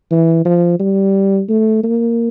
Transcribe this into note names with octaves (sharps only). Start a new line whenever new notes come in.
E3
F3
G3
A3
A#3